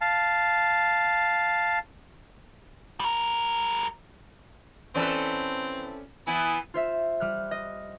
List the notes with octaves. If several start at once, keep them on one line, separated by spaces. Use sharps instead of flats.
F5 A5
G3 A#4
E3 C4 C#4 A4 B4 D5
E3 B3 E4 G#5
F4 C5 E5
G3 F6 F#6
D#5